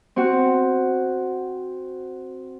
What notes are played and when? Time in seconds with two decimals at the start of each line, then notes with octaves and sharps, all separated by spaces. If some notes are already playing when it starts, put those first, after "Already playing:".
0.16 C4 F#4